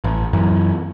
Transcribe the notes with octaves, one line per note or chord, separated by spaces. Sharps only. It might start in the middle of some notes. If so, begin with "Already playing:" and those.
A1
F#2 E3